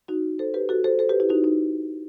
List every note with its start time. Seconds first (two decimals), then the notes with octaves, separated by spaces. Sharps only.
0.08 D#4 F#4
0.39 A4 C5
0.54 G4 B4
0.69 F#4 A4
0.84 A4 C5
0.99 A4 C5
1.09 G4 B4
1.20 E4 G4
1.30 D#4 F#4
1.44 D#4